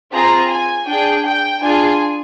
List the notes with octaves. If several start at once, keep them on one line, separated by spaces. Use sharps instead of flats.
C4 F4 G#4 A#5
G#5
D4 G#4 G5
G5
D4 F4 G#4 G#5